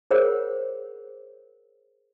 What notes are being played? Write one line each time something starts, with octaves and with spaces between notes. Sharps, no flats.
G#4 A#4 C5 C#5 F#5